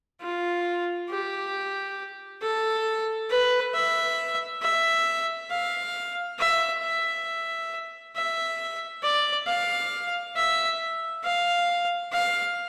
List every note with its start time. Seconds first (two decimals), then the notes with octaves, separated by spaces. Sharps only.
0.21 F4
1.10 G4
2.42 A4
3.30 B4
3.74 E5
4.62 E5
5.50 F5
6.39 E5
6.83 E5
8.15 E5
9.03 D5
9.47 F5
10.35 E5
11.24 F5
12.12 F5